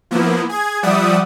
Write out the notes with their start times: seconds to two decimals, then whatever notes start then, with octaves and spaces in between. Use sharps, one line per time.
0.11 F3 A#3 B3 E4
0.49 G#4 G#6
0.83 F3 G3 D5 E5 F#5 D#6